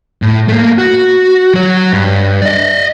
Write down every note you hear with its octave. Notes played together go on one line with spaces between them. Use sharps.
A2
A3 A#3
F#4
F#3 C#5
G2
D5 D#5